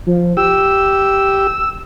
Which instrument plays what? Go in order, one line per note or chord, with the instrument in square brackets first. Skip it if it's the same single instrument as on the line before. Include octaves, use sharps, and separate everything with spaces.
[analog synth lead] F3
[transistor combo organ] G4 [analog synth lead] E6